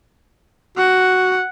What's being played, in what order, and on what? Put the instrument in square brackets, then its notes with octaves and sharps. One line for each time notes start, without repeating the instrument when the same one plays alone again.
[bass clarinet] F#4 [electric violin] F#5